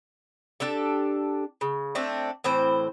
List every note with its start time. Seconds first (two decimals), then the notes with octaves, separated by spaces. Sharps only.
0.60 D4 G4 A4
1.61 C#3
1.95 A3 C4 D4
2.44 A2 E3 C4 C5